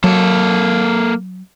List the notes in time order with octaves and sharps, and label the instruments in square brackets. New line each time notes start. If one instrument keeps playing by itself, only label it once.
[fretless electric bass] F#3 [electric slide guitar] A#3 A4